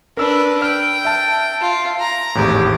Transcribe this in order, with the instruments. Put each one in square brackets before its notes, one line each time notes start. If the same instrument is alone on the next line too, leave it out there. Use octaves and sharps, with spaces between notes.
[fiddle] D4 B4 [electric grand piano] A#4 E6
[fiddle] G5 [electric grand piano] F6
[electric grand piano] E5 A5
[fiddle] F4
A#5
[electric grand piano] G#1 E2 A2 [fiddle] G4